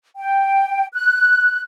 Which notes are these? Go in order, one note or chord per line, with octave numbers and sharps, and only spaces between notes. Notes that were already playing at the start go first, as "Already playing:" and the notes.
G5
F#6